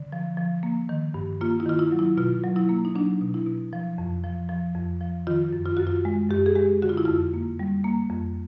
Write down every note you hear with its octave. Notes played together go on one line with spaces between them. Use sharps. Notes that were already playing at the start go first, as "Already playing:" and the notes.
Already playing: D3
F3
F3
A#3
D#3
G2
A#3 F4
E4
D#3 F4
E4
F#3
E4
B2 F4
F#3
E4
A#3
D#4
F#3 D4
B2
E4
B2
F3
F2
F3
F3
F2
F3
D#3 F4
F#2
F4
F#2 F#4
F4
G#3
F#2 G4
G#4
G#3 G4
D3 F#4
F4
E4
F2 F4
A#3
G3
A#3
F2